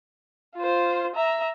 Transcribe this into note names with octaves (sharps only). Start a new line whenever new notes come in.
F4 C5
E5 A#5